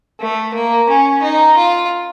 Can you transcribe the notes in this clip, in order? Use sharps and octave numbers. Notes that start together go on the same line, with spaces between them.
A3
A#3
C#4
D#4
F4